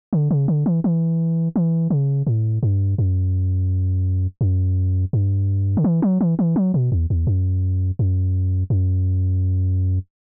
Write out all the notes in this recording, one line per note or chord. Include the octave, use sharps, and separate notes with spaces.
D3
C#3
D3
E3
E3
E3
C#3
A2
G2
F#2
F#2
G2
D3
E3
F#3
E3
E3
F#3
B2
E2
E2
F#2
F#2
F#2